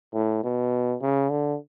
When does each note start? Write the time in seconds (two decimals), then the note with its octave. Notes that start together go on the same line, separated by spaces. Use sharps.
0.13 A2
0.43 B2
1.01 C#3
1.30 D3